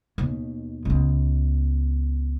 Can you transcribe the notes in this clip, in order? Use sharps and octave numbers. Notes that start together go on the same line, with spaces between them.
D#2 B2
C#2 B3